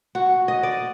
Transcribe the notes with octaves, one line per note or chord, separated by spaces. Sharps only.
F#4
D#5
D5